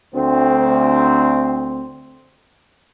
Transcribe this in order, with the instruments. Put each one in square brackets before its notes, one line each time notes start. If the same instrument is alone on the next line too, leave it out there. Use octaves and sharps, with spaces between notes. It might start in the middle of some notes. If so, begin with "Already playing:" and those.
[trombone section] D2 C4